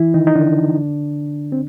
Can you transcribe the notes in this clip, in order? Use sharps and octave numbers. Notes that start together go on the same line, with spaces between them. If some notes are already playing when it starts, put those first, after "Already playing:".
Already playing: E3 E4
D#3 D#4
D#4
D3 D4
C4